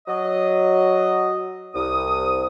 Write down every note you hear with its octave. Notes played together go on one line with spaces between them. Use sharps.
F#3 D#5
C2 D#6